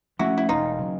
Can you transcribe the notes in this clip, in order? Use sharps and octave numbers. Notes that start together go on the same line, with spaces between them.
F3 A3 C#4 E4 F#4
E4
E1 D#4 F4
C#3 F#3